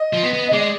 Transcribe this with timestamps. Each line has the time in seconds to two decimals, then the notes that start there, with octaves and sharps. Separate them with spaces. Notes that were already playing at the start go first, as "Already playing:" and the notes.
Already playing: D#5
0.13 F3
0.23 B3
0.34 B3
0.48 D#5
0.53 G#3 D5